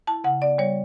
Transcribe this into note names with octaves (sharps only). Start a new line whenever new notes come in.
E4 A5
C#3 F#5
B3 D5
G3 C#5